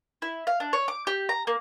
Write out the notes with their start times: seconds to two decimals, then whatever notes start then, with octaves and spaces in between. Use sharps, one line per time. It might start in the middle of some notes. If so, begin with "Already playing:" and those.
0.22 E4
0.47 F5
0.60 D4
0.73 C#5
0.88 D6
1.07 G4
1.29 A#5
1.47 A#3